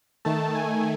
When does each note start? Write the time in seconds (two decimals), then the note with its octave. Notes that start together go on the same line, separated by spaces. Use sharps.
0.25 D#3 A3 A5
0.55 G#5